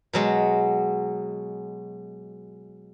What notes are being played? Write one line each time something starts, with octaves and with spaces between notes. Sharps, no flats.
B2 F#3 G#3